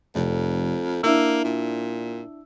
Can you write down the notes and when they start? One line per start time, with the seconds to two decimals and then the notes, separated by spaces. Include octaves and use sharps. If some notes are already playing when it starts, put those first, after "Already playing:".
0.15 F1 F2
1.03 A#3 D4 E4 E6
1.44 A#2